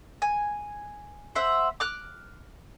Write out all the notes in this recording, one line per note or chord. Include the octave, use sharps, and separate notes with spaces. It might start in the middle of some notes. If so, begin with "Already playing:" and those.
G#5
C5 E5 F#5
D6 F6 F#6